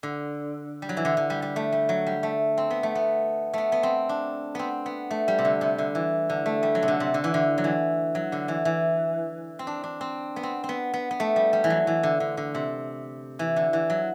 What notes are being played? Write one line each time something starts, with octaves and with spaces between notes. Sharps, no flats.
D3
G3
F#3
E3
D3
D3
G3
G3
A3
G3
F#3
G3
A3
C4
B3
A3
B3
A3 B3
B3
C4
D4
B3 C4
B3
A3
G3
C3
D3
C3
D3
E3
D3
A3
G3
F#3
C3
D3
C3
D3
E3
D3
F#3
E3
F#3
D3
E3
E3
C4
D4
D4
C4
B3
C4
C4
B3
B3
B3
A3
G3
G3
E3
F#3
E3
D3
D3
D3
C3
E3
D3
E3
F#3